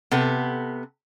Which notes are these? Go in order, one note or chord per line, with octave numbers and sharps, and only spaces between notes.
C3 B3 A4